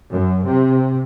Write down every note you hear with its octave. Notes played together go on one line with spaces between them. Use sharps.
F#2
C3